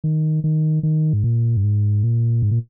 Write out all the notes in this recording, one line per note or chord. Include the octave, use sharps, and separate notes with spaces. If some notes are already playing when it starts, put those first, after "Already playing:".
D#3
D#3
D#3
G#2
A#2
G2
G#2
A#2
G#2
A#2